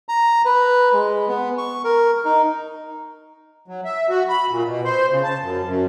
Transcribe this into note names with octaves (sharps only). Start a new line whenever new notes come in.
A#5
B4
G#3
B3
C#6
A#4
D#4
F#3
E5
F#4
B5
A#2
B2
C5
C#3
A5
F#2
F#2